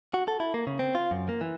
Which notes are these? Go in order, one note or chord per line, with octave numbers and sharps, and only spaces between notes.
F#4
A4
E4
A#3
C#3
C4
F4
F#2
A#3
E3